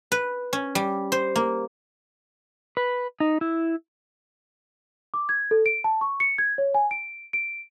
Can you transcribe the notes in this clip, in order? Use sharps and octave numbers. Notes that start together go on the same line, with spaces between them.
B4
C#4
G3
C5
A#3
B4
D#4
E4
D6
G#6
A4
D7
A5
C#6
C#7
G#6
C#5
G#5
D7
D7